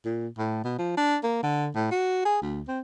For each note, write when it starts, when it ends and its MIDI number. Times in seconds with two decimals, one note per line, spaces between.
0.05 0.28 46
0.38 0.60 45
0.64 0.76 47
0.78 0.95 53
0.97 1.16 62
1.23 1.40 58
1.43 1.68 50
1.75 1.91 45
1.91 2.21 66
2.25 2.38 68
2.42 2.62 38
2.68 2.81 60